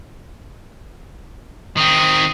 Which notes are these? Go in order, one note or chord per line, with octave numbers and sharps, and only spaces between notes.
D#3 C4 D#6